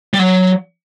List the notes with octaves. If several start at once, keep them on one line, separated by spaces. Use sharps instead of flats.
G3
F#3